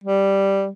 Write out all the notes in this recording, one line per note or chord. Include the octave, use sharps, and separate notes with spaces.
G3